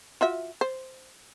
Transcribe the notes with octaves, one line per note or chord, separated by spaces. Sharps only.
F4 F#4 E5
C5